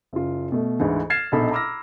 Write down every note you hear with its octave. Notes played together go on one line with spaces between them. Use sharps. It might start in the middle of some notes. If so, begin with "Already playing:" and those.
F#1 F4
B2 A3
D2 G#2 D3 E3
F6 G#6 A6 C7 E7
A#1 B2 D#4 A4 B5
A#5 B5 D6 E6 F6 A#6